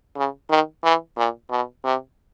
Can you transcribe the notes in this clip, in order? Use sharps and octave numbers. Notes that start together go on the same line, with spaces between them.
C#3
D#3
E3
A#2
B2
C3